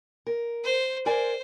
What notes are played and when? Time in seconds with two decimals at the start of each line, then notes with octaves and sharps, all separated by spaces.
0.27 A#4
0.64 C5
1.06 A#4 C5 D5 G#5